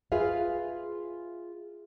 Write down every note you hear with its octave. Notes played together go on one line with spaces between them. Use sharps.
F4 G#4 B4 E5 F5